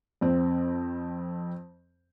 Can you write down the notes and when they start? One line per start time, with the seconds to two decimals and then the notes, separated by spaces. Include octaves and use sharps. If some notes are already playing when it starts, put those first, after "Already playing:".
0.21 F2 C4